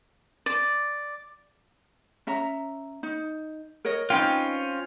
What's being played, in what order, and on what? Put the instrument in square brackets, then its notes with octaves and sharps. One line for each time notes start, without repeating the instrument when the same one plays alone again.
[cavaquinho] D5
[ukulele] C#4 E5 A#5
D#4
A#4 C#5 D#5
[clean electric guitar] C4 C#4 F4 [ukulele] D#4 B4 G5